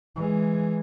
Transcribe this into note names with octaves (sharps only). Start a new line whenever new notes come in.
E3 G#3